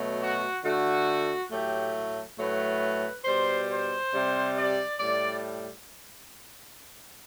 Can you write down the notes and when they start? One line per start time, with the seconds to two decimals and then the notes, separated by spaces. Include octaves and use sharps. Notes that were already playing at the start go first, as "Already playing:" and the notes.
Already playing: B2 F#3 A3
0.20 F#4
0.64 D3 A3 F#4
1.51 A2 F#3 A3 G4
2.38 A2 F#3 A3 B4
3.25 B2 G3 C5
3.69 C5
4.12 C3 G3
4.55 D5
4.99 A2 G3 D5